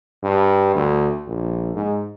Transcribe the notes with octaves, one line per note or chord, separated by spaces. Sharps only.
G2
D2
A#1
G#2